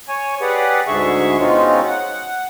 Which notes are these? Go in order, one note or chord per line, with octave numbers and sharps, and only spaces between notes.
C#5 G#5
G4 G#4 B4 D5 F#5
D2 G#2 D3 G#4 E5 C#6
B2 G#3 C4 C#4 D#4 F4
F#5